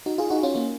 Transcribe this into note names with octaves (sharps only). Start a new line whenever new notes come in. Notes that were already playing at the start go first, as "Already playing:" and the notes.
D#4 F#4
F4 G#4
D#4 F#4
C#4 F4
A#3 C#4